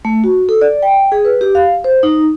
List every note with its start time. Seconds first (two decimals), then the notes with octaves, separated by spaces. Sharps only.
0.05 A3
0.24 F#4
0.49 A4
0.61 D5
0.83 G5
1.12 G#4
1.25 B4
1.41 G4
1.55 F5
1.84 C5
2.03 D#4